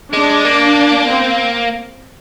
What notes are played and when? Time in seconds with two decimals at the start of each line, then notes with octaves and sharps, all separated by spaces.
0.13 G#3 D4
0.45 A#3
1.09 C4